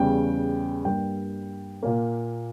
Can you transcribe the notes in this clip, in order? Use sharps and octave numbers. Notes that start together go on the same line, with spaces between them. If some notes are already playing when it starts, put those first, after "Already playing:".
Already playing: E2 C#3 G3 G5
G2 G3 A#3 G5
A#2 A#3